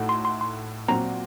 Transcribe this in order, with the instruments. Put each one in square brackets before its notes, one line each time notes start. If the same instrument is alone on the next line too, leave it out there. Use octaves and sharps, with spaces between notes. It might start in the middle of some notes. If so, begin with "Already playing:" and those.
Already playing: [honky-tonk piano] A2 A3 D#4 F#4
[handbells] C6
C6
C6
[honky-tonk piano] A#2 F#3 C4 F#4 [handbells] A#5